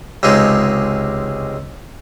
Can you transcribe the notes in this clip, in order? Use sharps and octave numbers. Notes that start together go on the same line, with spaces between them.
C#2 C3 G#3 D#4